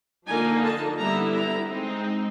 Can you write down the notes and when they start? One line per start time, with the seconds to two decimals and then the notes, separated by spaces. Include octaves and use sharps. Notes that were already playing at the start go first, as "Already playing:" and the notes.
0.28 D3 F3 A#3 D#4 G#5
0.64 A5
0.99 D3 G3 B3 E4 A#5
1.34 A#5
1.70 G#3 C4 D#4